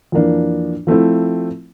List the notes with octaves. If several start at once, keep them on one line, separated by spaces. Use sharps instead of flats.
F2 E3 A#3 D4
F3 A3 C4 E4